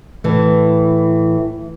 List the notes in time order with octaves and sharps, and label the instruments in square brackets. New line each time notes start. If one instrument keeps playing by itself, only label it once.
[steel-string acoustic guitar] A2 E3